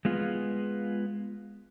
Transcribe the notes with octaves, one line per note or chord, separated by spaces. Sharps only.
G#3 B3 F4